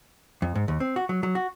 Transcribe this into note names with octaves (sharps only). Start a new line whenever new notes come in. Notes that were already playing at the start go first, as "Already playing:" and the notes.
F2
G#2
D#2
C4
F#4
F#3
F#3
F#4